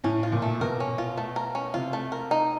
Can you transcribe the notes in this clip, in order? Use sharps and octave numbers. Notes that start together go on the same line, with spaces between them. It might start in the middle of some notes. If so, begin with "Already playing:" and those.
A2 C#4
F4
A#2
A3
B2 A#4
C#4
F4
A3
A#4
C#4
C3 F4
A3
A#4
D#4